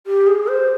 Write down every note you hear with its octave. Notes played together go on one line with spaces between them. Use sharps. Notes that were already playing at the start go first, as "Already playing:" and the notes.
G4
G#4
C5